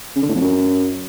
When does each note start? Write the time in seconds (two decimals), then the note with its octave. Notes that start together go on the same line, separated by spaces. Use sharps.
0.16 C#3
0.22 D3
0.29 A2
0.35 F2
0.41 F#2